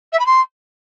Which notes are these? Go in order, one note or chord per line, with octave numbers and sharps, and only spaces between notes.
E5
B5
C6